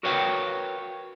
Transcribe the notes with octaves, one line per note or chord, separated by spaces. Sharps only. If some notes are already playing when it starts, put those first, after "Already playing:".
F#4 A#4 B4 C#5 F5 G5